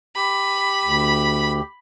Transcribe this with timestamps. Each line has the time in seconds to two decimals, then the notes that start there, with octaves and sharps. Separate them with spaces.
0.16 G4 B5
0.85 D2